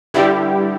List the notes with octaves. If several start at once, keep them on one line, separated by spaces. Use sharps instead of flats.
G2 D3 G3 E4 G4